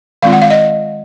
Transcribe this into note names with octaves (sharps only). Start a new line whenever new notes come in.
D#3 G#3 C4 F4 F5
F#5
F5
D#5